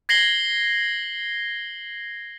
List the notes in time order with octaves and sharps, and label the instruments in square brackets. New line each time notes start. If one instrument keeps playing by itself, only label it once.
[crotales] G#6 A#6 C7 F#7 G7